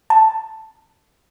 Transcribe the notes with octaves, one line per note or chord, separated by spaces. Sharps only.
A5